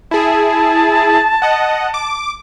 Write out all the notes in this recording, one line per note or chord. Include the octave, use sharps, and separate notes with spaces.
E4 G#4 A5
D#5 F#5
D6